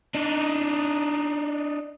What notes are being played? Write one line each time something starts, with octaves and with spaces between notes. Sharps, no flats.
D4 D#4